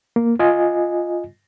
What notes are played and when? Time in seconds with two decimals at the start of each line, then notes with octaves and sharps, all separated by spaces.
0.16 A#3
0.39 F4 D#5 G#5